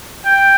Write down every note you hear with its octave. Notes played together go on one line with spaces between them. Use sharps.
G5